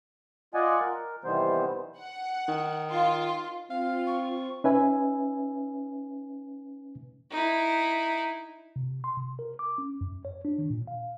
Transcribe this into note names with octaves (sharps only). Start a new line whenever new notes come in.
F4 D5 D#5 F#5 G#5
A#4
C3 D#3 E3 G3 B3 C5
F#5
D#3
F4
C4 F4 F5
C#6
C#4 D#4 B4 E5 G#5
D#4 E4
C3
C6
C3
A#4
D6
C#4
F#2
C#5
D4
D#3
A#2
F5